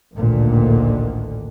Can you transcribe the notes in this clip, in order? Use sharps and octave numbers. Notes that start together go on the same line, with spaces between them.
A1 D2 A#2 D3 D#3